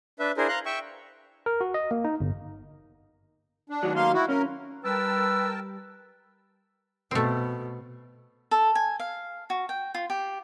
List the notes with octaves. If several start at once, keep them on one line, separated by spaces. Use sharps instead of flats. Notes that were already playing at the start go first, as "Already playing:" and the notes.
D4 B4 E5
D4 E4 G#4 A#4 C5
F5 A#5 C6 F#6
E5 G5 C#6 E6
A#4
F#4
D#5
A#3
D#4
G1
D4
D#3 E3 F#3
A#3 F5 C6
E4 F#4
C#4 A#4
G3 A#4 B4 G5 A5 E6
B2 A3 C4
A4
G#5
F5
F#4
G5
F4
G4